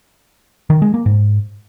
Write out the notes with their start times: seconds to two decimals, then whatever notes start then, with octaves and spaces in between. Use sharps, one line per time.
0.70 D#3
0.82 G#3
0.94 A#3
1.06 G#2